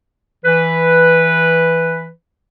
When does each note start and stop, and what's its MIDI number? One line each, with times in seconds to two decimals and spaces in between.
0.45 2.08 52
0.45 2.08 71